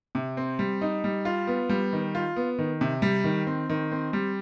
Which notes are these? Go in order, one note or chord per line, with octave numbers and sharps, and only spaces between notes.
C3
C4
G3
D#4
G3
F4
B3
G3
D#3
F4
B3
D#3
C3
G3
D#3
C4
D#3
C4
G3